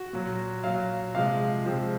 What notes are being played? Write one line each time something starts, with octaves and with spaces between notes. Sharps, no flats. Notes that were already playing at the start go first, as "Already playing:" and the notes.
Already playing: F#4
A#2 F#3
A#2 F#3 F5
C3 F3 G#3 F5
C3 F3 G#3